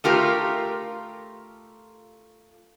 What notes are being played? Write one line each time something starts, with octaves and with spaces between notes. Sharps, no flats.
A3 F4 G4 A#4